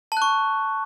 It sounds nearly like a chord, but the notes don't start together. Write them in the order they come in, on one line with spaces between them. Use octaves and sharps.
A5 F#6 C#6